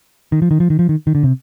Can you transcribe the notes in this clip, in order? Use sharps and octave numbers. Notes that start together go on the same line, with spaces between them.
D#3
F3
D#3
F3
D#3
F3
D#3
D#3
D3
C3